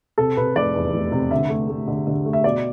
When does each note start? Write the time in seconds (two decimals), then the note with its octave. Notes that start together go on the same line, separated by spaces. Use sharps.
0.18 C3 A4
0.37 C3 B4
0.56 F1 D5
0.75 E2
0.94 F1
1.12 C3
1.31 D3 E5
1.50 A3
1.69 A3
1.88 D3
2.07 D3
2.26 A3
2.33 E5
2.44 B2 D5